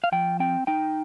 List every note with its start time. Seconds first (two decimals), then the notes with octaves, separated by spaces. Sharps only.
0.04 F5
0.12 F3 G5
0.40 C4 G5
0.67 D#4 G5